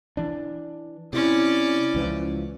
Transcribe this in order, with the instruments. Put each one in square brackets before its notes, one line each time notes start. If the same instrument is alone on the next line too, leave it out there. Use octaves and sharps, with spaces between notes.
[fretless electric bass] E3 D4
[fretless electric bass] C3 [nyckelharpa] C#4 D5 [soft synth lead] E4
[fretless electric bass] C#2 E3 F3